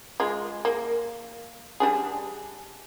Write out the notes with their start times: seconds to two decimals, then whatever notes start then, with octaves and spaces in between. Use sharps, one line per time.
0.20 G#3 F4
0.65 A#3
1.80 G3 D4 G#4